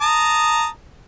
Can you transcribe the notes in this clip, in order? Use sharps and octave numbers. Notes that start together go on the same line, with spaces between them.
A5 A#5 D#6